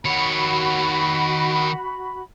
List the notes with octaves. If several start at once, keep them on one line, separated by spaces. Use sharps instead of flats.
D#3 F#4 C#5 B5